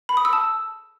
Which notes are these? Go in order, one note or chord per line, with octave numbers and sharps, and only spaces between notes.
B5
D#6
E6
A5